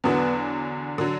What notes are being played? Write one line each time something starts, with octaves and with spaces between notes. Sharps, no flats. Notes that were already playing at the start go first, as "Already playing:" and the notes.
E2 D3 F#3 B3
D3 F#3